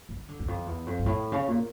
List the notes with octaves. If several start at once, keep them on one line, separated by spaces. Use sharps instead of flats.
E3
D3
E2
F2
E2
F2
G2
A2
C#3
A#2